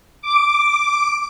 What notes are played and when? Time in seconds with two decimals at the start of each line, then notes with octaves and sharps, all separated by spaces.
0.21 D6